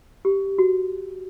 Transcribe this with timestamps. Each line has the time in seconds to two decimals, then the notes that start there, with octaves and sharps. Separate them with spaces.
0.25 G4
0.58 F#4